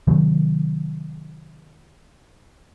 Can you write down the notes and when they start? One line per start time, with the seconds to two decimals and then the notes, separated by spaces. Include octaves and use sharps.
0.07 C3 D#3 F#3 A3